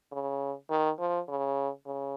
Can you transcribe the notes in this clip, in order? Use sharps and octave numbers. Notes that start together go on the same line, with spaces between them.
C#3
D#3
F3
C#3
C#3